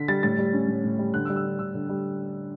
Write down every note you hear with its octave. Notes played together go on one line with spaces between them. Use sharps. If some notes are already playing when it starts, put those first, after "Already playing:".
Already playing: D3 B6
G3 A6
A2 A6
G3
C#4
A2
A2
G3
D3 F#6
E6
G3
E6
D4
D3 E6
D3
G3